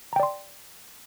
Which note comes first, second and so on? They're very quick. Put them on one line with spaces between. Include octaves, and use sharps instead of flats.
A#5 G5 D5 C6